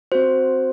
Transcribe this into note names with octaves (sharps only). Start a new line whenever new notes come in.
C4 F#4 C5